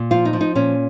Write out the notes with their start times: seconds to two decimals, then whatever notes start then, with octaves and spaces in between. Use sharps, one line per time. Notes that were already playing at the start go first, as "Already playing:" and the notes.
Already playing: A#2
0.11 F3 F4
0.25 D#4
0.33 F3
0.41 D#4
0.55 A#2 C#4